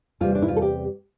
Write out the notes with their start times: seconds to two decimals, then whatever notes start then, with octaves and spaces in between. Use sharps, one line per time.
0.21 E2 C3 G3 F4
0.35 D4
0.42 E4
0.48 F4
0.56 A4
0.62 G4